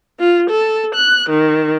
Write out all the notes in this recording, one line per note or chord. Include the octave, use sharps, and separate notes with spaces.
F4
A4
F#6
D#3